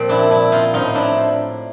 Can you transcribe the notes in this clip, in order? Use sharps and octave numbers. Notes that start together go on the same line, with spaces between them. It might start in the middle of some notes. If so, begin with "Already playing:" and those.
Already playing: A#2 F3 C4
D4 E4
D4 E4
D#4 F4
A2 F3 D#4 F4
D4 E4